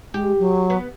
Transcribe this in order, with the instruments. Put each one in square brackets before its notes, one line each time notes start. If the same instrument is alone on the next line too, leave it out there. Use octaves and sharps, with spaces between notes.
[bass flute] G#3 [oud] G4
[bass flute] F#3
[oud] B3